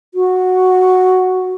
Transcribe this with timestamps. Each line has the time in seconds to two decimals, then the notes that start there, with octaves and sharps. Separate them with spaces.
0.14 F#4